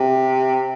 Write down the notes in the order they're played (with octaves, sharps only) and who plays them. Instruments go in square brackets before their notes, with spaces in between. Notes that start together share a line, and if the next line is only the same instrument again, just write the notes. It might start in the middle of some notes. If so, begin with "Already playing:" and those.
Already playing: [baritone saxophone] C3